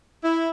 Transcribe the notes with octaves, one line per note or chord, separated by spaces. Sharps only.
E4